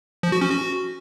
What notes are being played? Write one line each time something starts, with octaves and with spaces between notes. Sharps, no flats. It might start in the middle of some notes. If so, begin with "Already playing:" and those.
F3
F#4
C#4
F#4